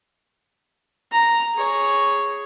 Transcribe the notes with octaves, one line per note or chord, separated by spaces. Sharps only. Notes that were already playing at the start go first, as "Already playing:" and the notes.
A#5
G#4 C#5